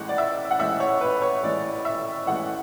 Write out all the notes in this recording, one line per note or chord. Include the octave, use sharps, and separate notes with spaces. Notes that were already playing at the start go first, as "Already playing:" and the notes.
Already playing: A1 A2 G#3 F#5
D5
E5
F#5
A1 A2 G#3 E5
C#5
B4
C#5
A1 A2 G#3 D5
E5
A1 A2 G#3 F#5